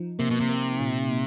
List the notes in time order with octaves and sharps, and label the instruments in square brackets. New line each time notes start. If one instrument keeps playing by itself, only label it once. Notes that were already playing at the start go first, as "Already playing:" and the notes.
Already playing: [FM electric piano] F3 D#4
[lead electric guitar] C3 [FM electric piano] A#3
[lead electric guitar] B2
C3
[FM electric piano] A#3
A#2
A#2